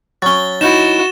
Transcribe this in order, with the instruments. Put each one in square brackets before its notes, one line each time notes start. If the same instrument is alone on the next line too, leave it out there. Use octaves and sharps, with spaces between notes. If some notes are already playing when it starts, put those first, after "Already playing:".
[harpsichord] F#3 C#4 [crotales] A6 G7
[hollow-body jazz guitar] D#4 E4 [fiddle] F#4 [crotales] E7